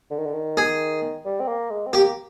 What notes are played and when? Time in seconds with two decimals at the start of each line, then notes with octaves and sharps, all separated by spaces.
0.11 D3
0.19 D#3
0.26 D3
0.34 D#3
0.57 G#4
1.25 G3
1.40 C4
1.48 A#3
1.70 G#3
1.87 C4
1.93 A#3 G4